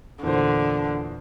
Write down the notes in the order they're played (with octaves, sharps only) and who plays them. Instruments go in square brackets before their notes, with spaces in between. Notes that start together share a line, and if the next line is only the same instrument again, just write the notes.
[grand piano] E2 A#2 C5 [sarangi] D3